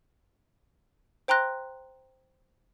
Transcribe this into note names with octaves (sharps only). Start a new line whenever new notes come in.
C5 G5 A#5 C6 F#6 A#6